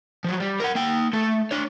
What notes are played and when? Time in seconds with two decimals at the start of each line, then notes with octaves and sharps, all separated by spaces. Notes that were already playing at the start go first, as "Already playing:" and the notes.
0.24 F3 F#3
0.40 G3
0.60 A#4 F#5
0.75 A#3 G5
1.13 A3 A4
1.51 D4 C#5